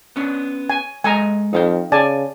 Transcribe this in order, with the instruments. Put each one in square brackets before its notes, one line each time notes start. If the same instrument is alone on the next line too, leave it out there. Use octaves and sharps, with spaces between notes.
[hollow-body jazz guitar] B3 C#4 D4
[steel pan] G#5
[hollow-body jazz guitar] G#3 A4 D#5 [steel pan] G#5 A#5
[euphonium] F2 [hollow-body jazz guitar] D#4 F5 G5
[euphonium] C#3 [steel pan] D5 G#5 A5